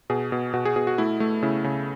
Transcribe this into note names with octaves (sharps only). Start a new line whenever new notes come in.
B2 G#4
B2
B2 F#4
G#4
B2 G#4
F#4
A3 E4
A3
C#3 E4
C#3